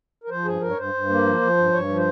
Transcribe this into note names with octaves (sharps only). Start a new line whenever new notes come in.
A#4
F3 C5
G2 G#4
G2 A#4
C#5
G2 C5
G2
A#3
F3
F3
G2
G2 C#5
F3
C5